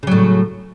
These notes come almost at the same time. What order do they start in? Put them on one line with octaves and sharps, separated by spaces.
C#3 F#3 A2